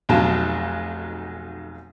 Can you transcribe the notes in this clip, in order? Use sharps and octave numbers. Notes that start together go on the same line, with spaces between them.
F1 B1 F#3 A5